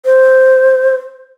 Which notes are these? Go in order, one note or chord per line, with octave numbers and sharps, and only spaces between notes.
C5